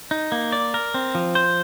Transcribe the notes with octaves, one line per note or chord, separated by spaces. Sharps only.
D#4
A#3
D5
A#4
C4
F3
C5